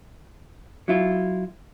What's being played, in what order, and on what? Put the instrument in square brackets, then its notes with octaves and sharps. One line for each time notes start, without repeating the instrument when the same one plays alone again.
[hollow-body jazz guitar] F#3 E4 F4